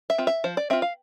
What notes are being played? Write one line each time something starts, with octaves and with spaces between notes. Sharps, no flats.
E5
C4 F4
E5
F3 C5
D5
C4 F4 E5
F5